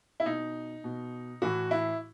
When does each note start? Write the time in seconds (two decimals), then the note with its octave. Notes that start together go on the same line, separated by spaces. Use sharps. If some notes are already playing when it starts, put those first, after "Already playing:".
0.20 E4
0.25 B2 D#4
0.84 B2
1.42 A2 E3 F#4
1.71 E4